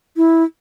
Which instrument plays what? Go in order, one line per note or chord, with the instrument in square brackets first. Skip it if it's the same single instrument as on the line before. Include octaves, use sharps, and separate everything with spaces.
[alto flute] E4